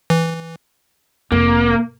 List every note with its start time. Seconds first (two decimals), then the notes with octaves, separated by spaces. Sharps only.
0.10 E3
1.32 F1 A#3